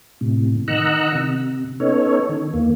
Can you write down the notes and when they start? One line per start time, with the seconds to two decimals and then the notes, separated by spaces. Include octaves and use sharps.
0.21 A2 C3
0.68 D#3 D#5 F#5 A#5 E6 F#6
1.15 C3
1.80 B3 C#4 D#4 A4 C#5
2.29 D#3
2.54 D#2 A#3